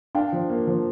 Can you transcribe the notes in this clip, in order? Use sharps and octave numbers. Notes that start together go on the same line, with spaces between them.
D4 F5 G5
F3
A#3
F3